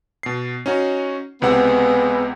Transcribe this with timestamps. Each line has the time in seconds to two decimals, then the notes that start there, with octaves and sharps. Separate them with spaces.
0.23 B2 C7
0.66 C#4 D#4 F#4
1.42 C#2 C3 G#3 B3 F#5